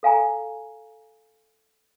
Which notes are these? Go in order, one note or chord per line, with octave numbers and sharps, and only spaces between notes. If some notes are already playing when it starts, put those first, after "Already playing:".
A4 F5 G#5 A#5